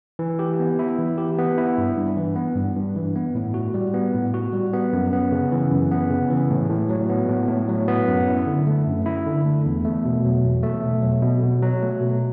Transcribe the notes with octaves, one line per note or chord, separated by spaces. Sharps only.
E3
G4
B3
E4
E3
G4
B3
E4
G2
G2
E3
B3
G2
G2
E3
B3
A2
F#4
G3
B3
A2
F#4
G3
B3
F#2
B3
C#3
E3
F#2
B3
C#3
E3
A2
A2
F#3
B3
A2
A2
F#3
B3
F#2
E4
D3
A3
F#2
E4
D3
A3
E2
A3
B2
F#3
E2
A3
B2
F#3
B2
B2
F#3
A3
B2